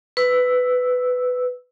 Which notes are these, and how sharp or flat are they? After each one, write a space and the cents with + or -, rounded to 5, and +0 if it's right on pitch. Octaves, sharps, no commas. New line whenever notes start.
B4 +15 E6 +0